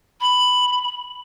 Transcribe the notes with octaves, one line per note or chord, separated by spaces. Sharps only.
B5